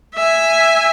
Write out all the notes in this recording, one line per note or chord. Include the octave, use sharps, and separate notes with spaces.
E5 G#5